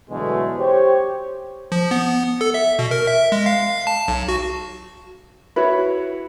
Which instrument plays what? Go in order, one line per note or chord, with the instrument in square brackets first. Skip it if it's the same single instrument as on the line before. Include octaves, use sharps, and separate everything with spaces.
[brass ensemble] B2 D3 E3 F#3 G#3 A3
G4 C5 C#5
[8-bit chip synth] F3
B3
A4
E5
B2
A#4
E5
G#3
F5
A5
B1
F#4
[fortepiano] E4 F#4 C#5 [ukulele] B4